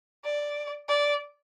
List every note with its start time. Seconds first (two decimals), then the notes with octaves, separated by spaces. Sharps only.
0.24 D5
0.88 D5